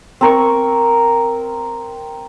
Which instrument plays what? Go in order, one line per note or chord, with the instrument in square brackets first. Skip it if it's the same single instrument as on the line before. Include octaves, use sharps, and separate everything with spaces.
[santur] C4 A#4 C#6